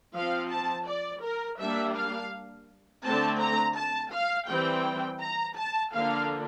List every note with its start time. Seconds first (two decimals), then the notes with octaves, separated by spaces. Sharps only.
0.15 F3 C4 F5
0.51 A5
0.87 D5
1.23 A#4
1.59 G3 A#3 D4 E5
1.96 F5
3.04 D3 A3 C4 A5
3.40 A#5
3.76 A5
4.12 F5
4.49 E3 G3 C4 G5
5.21 A#5
5.58 A5
5.94 D3 F3 A#3 D4 F5